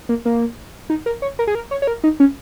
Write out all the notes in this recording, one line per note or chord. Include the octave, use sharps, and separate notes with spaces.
A#3
A#3
D#4
A#4
C#5
A#4
G#4
A#4
C#5
C#5
A#4
D#4
C#4